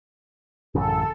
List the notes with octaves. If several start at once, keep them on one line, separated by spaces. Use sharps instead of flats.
A1 F#2 C#3 A4